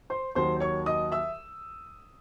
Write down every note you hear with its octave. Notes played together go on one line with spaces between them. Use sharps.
C5 C6
D#2 D#3 F#3 C5 C6
C#5 C#6
D#5 D#6
E5 E6